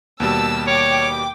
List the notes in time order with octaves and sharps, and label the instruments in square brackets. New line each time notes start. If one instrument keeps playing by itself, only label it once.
[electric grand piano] D#2 B2 G3 [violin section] A5 E6
[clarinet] C#5 [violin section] G5 D6